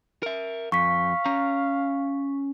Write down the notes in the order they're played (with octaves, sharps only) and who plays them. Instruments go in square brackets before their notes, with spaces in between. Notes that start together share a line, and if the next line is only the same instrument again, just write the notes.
[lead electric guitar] A#4 E5
[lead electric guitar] F2 [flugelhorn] F5 [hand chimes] C#6 B6
[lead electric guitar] C#4 A#5